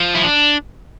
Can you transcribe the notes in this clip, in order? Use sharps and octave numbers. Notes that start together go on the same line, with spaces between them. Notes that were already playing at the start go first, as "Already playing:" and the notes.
Already playing: F3
E4
D4